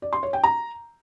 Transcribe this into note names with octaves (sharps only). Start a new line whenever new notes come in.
D5
C6
C#5
G5
A#5